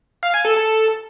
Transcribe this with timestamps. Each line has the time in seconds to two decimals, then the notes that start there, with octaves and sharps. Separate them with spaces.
0.23 F5
0.34 G#5
0.45 A4
0.56 A4